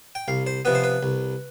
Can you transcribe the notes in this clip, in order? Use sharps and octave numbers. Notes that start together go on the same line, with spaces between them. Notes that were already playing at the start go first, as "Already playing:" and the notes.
G5
C2 F5
C5
C3 F3 B3 B4
C5
B4
C2